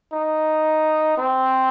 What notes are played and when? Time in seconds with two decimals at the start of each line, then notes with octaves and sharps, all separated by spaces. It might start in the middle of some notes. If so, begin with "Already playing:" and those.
0.13 D#4
1.18 C4